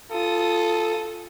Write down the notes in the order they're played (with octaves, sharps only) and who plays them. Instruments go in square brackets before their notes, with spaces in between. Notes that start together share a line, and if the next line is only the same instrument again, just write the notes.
[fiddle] F4 D#6 [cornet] A4